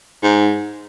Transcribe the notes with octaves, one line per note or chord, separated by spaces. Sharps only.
G#2